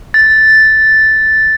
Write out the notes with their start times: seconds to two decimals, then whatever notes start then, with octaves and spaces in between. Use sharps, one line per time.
0.14 A6